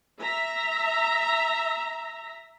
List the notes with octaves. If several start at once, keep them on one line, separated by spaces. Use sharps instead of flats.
E5 A#5